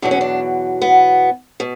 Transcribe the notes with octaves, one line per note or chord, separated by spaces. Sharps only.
E2 B2 F#3 D4
C#4
D4
B3
B2